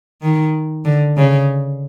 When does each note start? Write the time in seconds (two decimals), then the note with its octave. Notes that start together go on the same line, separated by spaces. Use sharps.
0.22 D#3
0.85 D3
1.17 C#3